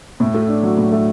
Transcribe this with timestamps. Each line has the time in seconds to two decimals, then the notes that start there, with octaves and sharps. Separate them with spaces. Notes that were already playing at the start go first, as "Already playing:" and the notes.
0.20 A2
0.34 A3
0.48 D4
0.63 F#3
0.77 A2
0.92 A3